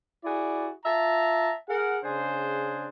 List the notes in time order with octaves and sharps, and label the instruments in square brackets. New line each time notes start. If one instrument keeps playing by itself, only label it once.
[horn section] E4 F#4 G#4 D5
F4 E5 A5 A#5
G#4 A#4 F#5
C#3 D4 G#4 C5